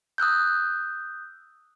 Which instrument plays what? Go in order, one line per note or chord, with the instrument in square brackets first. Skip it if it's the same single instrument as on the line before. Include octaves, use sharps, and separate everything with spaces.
[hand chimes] D#6 E6 F#6 G6